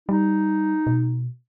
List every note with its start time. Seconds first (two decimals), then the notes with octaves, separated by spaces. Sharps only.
0.09 G3 D#4
0.87 B2